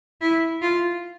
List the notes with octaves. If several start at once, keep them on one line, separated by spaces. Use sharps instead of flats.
E4
F4